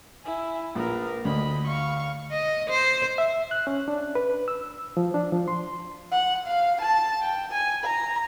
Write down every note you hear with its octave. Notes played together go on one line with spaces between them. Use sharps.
E4 G#5
A#1 A#4 B4
D2 D#5 B5
F5 C#6
D#5
C5
E5
F#6
C#4
D4
B4
E6
F3
D4
F3
C6
F#5
F5
A5
G5
G#5
A#5